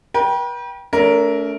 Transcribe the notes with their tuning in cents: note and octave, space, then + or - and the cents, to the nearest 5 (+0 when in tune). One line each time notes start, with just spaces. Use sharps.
B4 -45 G5 +0
A3 -10 C#4 +45 A#4 +0